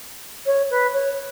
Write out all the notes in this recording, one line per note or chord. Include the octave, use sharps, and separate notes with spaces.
C#5
B4
C#5